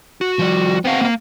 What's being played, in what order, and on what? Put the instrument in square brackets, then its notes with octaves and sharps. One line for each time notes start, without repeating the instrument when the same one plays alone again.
[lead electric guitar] F#4
[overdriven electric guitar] F3 G3
[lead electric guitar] B3 F5 [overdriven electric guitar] C4 F#4
[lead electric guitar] A#3 F5